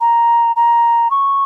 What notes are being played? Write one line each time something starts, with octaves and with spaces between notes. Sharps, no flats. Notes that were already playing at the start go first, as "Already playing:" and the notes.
A#5
A#5
C#6